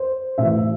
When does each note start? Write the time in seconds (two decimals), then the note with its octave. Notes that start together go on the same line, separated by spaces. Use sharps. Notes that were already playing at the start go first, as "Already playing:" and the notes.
Already playing: C5
0.38 A2 E3 E5